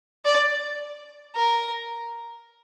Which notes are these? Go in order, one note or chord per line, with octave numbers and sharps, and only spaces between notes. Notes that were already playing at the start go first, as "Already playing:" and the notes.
D5
A#4